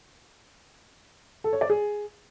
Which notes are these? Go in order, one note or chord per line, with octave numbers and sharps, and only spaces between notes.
A4
C#5
D5
G#4